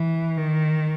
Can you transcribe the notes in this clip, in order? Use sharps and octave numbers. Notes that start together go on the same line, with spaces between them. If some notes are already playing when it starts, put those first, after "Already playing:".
Already playing: E3
D#3